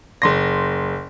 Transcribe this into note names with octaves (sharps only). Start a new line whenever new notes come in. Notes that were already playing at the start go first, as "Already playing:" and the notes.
F#1 C6 A#6